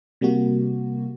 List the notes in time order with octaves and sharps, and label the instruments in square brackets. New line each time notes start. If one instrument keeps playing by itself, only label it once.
[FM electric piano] C3 G3 A#3 F#4